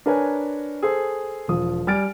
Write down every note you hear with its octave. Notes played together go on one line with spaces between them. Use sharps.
D4 A#4 B4 C#5 G#5
G#4 A4 C5
E1 F3 D#6
G3 G#5 F6 A6 D7